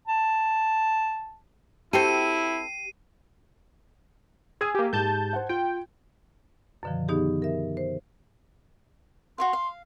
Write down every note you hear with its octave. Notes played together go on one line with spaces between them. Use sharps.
A5
C4 E4 F#4 G4 A4 C7 D#7
G#4 E6 G#6 D#7
A#3 G4
G#2 G4 A5 G6
C5 F#5
F4 G5
F#2 B2 D3 D#3 F3
D#3 B3 D#4 G4 G#4
A#4 E5
C5
F#4 C#5 F5 C6
F5